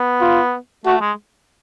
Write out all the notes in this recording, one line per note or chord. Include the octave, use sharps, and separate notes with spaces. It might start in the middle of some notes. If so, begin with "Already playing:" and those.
Already playing: B3
F4
A3 F#4
G#3